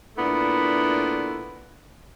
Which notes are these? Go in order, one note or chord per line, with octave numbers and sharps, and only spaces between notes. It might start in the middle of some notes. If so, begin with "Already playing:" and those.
A#2 A3 B3 D4 E4